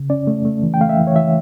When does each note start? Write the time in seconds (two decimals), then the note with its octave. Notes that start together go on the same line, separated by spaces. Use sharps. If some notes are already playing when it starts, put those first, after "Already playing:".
Already playing: C#3
0.10 C#4 D5
0.27 A3
0.45 A3
0.63 E3
0.74 G5
0.80 A3 F5
0.89 E5
0.99 E3
1.07 C#5
1.15 E3 E5